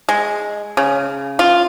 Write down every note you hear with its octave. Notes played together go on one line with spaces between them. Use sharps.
G#3
C#3
F4